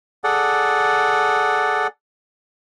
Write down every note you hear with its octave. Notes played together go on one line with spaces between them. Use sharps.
G#4 A4 D5 F#5